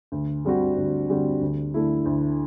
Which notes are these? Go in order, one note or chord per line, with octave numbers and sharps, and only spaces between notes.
D2
D3 G3 C4 F#4
D2
D3 G3 C4 F#4
D2
D3 A3 E4
D2